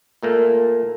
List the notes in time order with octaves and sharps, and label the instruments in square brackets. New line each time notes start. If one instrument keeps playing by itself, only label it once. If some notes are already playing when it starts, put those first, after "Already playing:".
[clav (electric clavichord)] A#2 A3 A#3